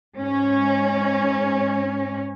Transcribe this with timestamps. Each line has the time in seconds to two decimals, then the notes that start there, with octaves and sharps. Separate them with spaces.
0.17 G#2 C#4